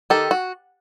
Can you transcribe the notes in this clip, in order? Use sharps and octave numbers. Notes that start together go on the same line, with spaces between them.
D#3 G4 A4
F#4